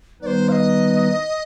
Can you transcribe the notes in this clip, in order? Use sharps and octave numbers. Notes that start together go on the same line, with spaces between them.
D#3 G3 B3 D#4 B4 C5 D5
F5
D#5